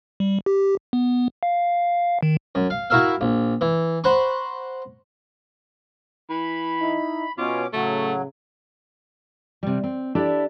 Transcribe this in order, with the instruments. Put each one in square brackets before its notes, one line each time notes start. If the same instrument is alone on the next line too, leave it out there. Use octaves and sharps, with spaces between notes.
[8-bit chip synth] G3
G4
B3
F5
D#3
[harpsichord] F#2
F5
E4 F#4 A#4 E5 F5
A#1
E3
C5 F#5 A#5 B5 C#6
[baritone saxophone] E3 [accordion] B5
[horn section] D#4 E4
[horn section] B2 [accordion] C#4 D6 [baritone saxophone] F4
[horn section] A2 C#3 [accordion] F#3 [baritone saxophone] A3
[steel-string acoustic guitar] C3 G3
C4
D4 E4 G4 A4 D5